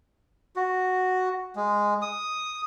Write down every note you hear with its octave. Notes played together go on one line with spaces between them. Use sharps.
F#4
G#3
D#6